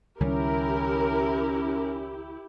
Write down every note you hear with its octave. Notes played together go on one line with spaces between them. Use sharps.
C#2 D#3 G3 C#4 E4 G4 A#4